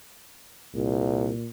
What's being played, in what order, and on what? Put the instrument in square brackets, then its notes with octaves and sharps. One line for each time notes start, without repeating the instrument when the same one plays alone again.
[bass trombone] C2 [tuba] A#2